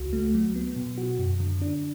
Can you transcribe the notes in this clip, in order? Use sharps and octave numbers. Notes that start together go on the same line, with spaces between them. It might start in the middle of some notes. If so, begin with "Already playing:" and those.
Already playing: C#2 F#4
A3
F#3
B3
B2
F#4
F#2
D3
D4